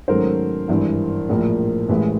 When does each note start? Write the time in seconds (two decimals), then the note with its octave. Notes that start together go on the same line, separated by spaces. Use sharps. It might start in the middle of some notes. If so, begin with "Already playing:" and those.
0.08 G#2 D#3 F#3 A3 C#4 A#4 C5
0.68 G#1 G2 E3
1.29 A#1 A2 F3 A#3
1.89 A1 A2 E3 G#3 B4